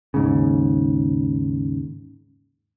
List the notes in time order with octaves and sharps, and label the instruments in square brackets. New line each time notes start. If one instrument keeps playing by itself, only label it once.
[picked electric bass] D#2 G#2 C#3